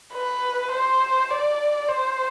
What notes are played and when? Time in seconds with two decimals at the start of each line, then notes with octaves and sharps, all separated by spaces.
0.14 B4
0.72 C5
1.31 D5
1.89 C5